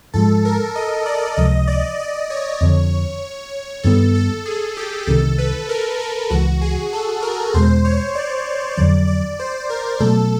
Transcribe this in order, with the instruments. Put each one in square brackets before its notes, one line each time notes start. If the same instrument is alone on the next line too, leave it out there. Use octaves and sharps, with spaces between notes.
[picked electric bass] G#2 F3 G#3 [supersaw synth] A4
[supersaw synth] A#4
D#5
D5
[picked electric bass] C#2 C3 F3 [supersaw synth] D#5
[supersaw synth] D5
D5
C#5
[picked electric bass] F2 D3 F3
[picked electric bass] G2 D#3 G3 B3 [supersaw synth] A4
[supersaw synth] A4
G#4
G4
[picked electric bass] C2 C3 D#3 [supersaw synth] A4
[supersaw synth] B4
A#4
A#4
[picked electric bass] C#2 C#3 E3 [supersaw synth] F#4
[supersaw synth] G#4
A4
A#4
[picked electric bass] E2 B2 G#3 [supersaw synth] C5
[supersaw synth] C#5
D5
[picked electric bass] F2 D3 F#3 [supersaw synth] D5
[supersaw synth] D5
C5
A#4
[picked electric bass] B2 F#3 A3 [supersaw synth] A4